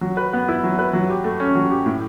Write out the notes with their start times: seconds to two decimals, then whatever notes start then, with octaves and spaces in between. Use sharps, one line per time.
0.01 F#3
0.17 B4
0.33 B3
0.49 E4
0.64 F#3
0.79 B4
0.93 F#3
1.10 G4
1.24 A3
1.40 C#4
1.55 F#3
1.71 G4
1.86 A2